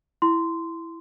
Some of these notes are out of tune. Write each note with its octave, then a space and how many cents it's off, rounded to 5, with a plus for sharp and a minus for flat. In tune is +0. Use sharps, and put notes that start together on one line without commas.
E4 +5 C6 -10